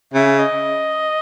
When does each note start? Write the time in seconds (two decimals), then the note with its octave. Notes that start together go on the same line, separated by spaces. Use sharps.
0.14 C#3 E5
0.39 D#5